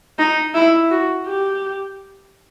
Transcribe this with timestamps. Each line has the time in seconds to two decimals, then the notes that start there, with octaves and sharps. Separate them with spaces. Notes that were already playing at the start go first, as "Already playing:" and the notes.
0.18 D#4
0.54 E4
0.91 F#4
1.26 G4